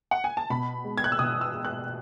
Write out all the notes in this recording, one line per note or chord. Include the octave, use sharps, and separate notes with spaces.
F#5
G#5
A5
B2 B5
G#3
G#6
F#6
E6
B2 D#6
E6
G#3
F#6